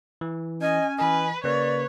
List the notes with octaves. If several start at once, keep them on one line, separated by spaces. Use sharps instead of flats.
E3
C#4 D#5 G#5
E3 B4 D#5 G#5
C#3 A#3 B4 C#5 D5